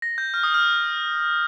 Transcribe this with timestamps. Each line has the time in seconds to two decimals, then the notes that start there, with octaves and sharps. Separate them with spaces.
0.02 A#6
0.18 G6
0.34 F6
0.43 D#6
0.54 F6